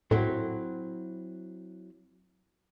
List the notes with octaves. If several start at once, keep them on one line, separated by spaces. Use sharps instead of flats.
A2 F#3 C4 E4